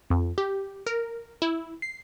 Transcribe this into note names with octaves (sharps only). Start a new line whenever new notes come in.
F2
G4
A#4
E4
C7